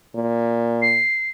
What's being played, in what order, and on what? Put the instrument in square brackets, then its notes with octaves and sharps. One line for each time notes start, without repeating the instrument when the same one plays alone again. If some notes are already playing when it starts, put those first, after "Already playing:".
[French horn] A#2
[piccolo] C7